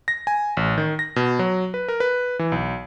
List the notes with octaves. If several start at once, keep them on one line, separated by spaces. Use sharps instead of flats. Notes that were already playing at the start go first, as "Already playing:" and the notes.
A#6
G#5
A1
D#3
A#6
B2
F#3
B4
A#4
B4
E3
B1